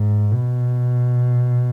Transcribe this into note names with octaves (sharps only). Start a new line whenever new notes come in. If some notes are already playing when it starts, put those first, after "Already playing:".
Already playing: G#2
B2